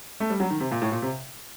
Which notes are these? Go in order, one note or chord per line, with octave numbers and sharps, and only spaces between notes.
A3
G3
F#3
D#3
C3
A#2
A2
A#2
C3